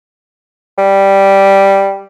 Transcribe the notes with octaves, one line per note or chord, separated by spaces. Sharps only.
G3